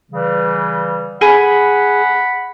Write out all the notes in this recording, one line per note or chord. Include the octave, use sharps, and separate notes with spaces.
C#3 E3 G3
G#4 F#5 B5